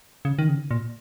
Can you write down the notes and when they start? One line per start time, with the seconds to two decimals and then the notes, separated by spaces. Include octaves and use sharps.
0.25 C#3
0.39 D#3
0.49 C#3
0.71 A#2